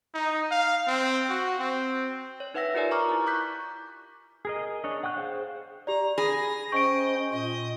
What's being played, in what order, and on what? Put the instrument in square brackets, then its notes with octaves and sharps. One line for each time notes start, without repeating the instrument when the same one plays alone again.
[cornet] D#4
F5
C4
F#4
C4
[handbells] C#5
D#4 B4 E5 F#5 E6 A#6
F4 G4 A#4 D5 G#5
A#5 C#6 D6 F6
E4 A#5
C#6 D6 F#6 G6 B6
[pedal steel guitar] G#4 A#4 D#5
D4 C#5 D#5
F#5 G5 C#6 F#6
G#4 C5 F5
[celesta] G4 D5 [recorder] A#5
[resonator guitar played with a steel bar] G#4 [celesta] B5 [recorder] A#6
[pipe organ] C#4 C5 G5 [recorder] D#5 [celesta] C#6 D7
[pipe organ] A#2 F4 [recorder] D#5